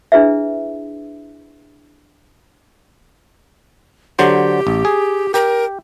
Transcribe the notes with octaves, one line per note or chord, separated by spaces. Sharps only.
D4 E4 G#4 B4 E5
D3 F#3 G4 C5
A1
G#4
G4 A#4